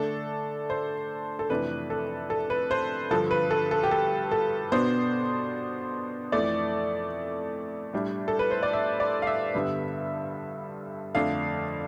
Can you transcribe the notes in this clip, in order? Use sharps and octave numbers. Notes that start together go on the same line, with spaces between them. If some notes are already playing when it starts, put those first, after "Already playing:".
Already playing: D3 A3 D4 A4
C5
A4
F2 C3 E3 A3 D4 B4
A4
A4
B4
C5
G2 D3 F3 A4
B4
A4
A4
G4
A4
A4
B2 B3 D4 C5
F2 E3 A3 D5
A2 G3 D4
A4
B4
C5
D5
E5
D5
F5
E5
G2 D3 G3 B3
F2 D3 A3 D4 F5